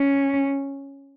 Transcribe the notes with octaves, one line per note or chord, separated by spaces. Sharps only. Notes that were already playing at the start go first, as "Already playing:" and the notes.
Already playing: C#4